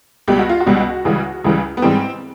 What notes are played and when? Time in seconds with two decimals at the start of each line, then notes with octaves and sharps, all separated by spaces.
0.28 C#2 B2 G3 G4
0.39 F#4
0.49 F4
0.60 F#4
0.66 C#2 B2 G3
1.05 C#2 C#3 E3 G3
1.44 C#2 C#3 E3 G3
1.77 B3
1.82 G#2 E3 G3 C4